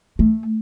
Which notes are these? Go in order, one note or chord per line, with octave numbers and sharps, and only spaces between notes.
A3